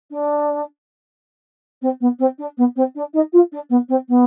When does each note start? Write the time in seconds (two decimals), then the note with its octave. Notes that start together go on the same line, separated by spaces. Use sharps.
0.10 D4
1.81 C4
2.00 B3
2.19 C4
2.38 D4
2.57 B3
2.76 C4
2.95 D4
3.13 D#4
3.32 F4
3.52 D4
3.69 B3
3.88 C4
4.08 B3